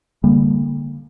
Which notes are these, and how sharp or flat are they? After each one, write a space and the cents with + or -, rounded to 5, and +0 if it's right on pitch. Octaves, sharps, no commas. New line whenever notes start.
D3 +0 G3 +35 A#3 +0